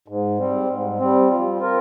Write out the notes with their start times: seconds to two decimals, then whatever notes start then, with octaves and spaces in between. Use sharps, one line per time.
0.08 G#2
0.38 G3 C4
0.68 G#2
0.98 G3 C4
1.28 F3
1.58 C4 F4 A#4